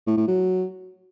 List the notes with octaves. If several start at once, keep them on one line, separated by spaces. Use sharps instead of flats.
A2
A2
F#3